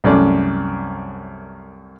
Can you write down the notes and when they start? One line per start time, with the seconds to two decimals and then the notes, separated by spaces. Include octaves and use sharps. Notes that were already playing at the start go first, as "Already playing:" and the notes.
0.04 C2 F#2 A3 D5